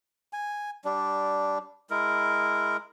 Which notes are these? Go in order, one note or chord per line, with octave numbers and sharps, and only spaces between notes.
G#5
G3 D4
G#3 E4 A#4